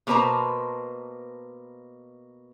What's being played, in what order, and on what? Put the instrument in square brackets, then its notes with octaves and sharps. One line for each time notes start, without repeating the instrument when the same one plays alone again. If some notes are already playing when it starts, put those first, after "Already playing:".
[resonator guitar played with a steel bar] B2 A#3 B4 C5 A5 A#5